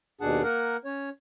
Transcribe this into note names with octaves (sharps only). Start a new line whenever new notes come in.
D#2 B2 D4 G#4 F#5 A5
A#3 A#4 F#5
C#4 C#5